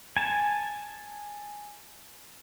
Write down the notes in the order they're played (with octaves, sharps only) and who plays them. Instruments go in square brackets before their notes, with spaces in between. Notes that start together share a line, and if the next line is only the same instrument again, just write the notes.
[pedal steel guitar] G#5 A5